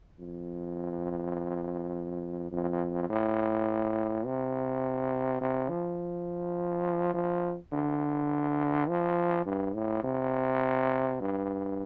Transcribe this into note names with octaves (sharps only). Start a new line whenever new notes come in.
F2
F2
A2
C3
C3
F3
F3
D3
F3
G2
A2
C3
G2